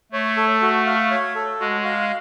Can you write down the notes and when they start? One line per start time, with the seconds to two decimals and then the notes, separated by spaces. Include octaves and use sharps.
0.12 A3 C#5
0.37 A4
0.62 F#4
0.86 F5
1.11 C#5
1.35 A4
1.60 G#3 F#4
1.85 F5